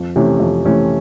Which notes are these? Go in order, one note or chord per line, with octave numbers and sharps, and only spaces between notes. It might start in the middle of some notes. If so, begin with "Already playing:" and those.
Already playing: F2
C3 E3 A3 C#4
F2
C3 E3 A3 C#4